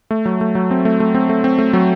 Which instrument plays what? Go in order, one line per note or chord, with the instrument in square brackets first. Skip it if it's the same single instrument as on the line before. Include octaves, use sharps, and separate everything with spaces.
[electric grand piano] A3
F#3
A3
F#3
C4
A3
A3
C4
A3
C4
A3
F#3